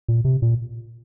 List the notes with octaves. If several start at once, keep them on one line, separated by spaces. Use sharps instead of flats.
A#2
C3
A#2